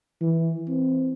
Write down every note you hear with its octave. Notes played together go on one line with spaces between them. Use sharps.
E3
C4